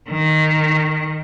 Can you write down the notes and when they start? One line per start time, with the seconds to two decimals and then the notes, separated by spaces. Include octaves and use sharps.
0.11 D#3